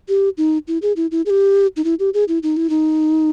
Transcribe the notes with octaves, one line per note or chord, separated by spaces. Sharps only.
G4
D#4
E4
G#4
E4
E4
G#4
G4
D#4
E4
G4
G#4
E4
D#4
E4
D#4